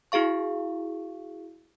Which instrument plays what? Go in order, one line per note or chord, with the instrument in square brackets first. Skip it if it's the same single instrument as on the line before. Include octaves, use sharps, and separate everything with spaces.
[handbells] E4 F#4 G#4 F5 C#6